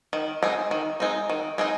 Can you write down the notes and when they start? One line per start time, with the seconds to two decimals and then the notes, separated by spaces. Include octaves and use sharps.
0.13 D#3
0.43 G#3 C4 D#4
0.71 D#3
1.00 G#3 C4 D#4
1.30 D#3
1.58 G#3 C4 D#4